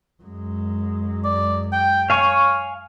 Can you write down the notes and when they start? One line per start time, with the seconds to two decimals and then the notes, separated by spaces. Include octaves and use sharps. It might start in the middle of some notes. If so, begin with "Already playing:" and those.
0.23 F#2 G#3
1.24 D5
1.73 G5
2.10 C#5 F5 G#5 C#6